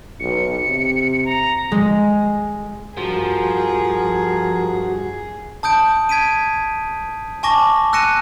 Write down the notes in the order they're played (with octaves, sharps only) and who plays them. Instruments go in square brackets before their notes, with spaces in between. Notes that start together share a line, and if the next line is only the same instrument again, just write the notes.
[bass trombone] B1 [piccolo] C#7
[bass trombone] C3
[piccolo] A#5
[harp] G#3
[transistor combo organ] G2 F#4 [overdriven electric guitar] F3 [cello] G#4 [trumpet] A#4
[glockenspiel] A5 D#6 G6 D7
G#6 B6 D7 D#7
G#5 A5 C#6 D6 A#6
E6 F#6 A#6 C#7 D#7 E7